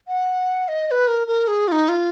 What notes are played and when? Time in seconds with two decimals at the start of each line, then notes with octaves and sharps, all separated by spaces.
0.07 F#5
0.68 D#5
0.87 D#5
0.91 B4
1.08 A#4
1.27 A#4
1.48 G#4
1.68 F4
1.72 D#4
1.89 F4